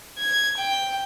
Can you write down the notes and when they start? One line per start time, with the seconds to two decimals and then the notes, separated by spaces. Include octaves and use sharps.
0.18 G#6
0.58 G5